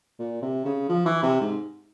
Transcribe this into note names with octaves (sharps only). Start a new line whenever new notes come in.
A#2
C3
C#3
F3
E3
C3
G#2